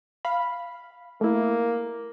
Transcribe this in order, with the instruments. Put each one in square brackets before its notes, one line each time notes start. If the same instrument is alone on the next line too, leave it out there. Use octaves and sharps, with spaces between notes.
[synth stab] F5 B5
[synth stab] A3 E4 [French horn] A#3